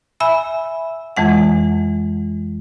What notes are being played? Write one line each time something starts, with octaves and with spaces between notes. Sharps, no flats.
E5 G#5 B5 E6
F2 E3 G#3 F#5